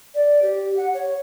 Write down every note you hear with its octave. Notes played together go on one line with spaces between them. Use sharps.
D5
G4
F#5
C#5